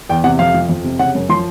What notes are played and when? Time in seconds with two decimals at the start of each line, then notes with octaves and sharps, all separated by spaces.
0.09 E2 G5
0.24 C3 F#5
0.39 F2 F5
0.54 F3
0.69 F2
0.84 C3
0.99 C#3 F#5
1.15 F#2
1.29 F3 C6